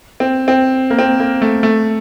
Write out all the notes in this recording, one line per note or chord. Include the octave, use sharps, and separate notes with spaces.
C4
C4
A#3
C4
A#3
A3
A3